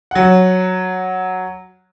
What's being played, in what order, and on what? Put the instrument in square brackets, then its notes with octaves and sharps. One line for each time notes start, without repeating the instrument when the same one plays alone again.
[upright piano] F#3 F#5